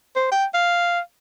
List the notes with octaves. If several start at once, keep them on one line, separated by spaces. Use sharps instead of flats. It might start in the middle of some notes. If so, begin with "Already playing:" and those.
C5
G5
F5